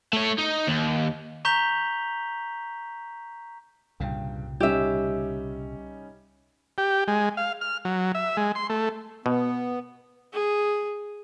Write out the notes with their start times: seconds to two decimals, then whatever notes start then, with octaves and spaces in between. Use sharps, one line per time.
0.13 A3 C#5
0.38 D#4
0.67 D#2
1.45 A#5 C#6 G6 B6 F7 G7
4.00 C2 G2 A#2 C#3 G5
4.60 G3 C#4 D#4 G4 E5
6.78 G4
7.08 G#3
7.37 F5
7.61 F6
7.85 F#3
8.15 E5
8.37 G#3
8.55 C6
8.70 A3
9.26 B2 B3
10.33 G#4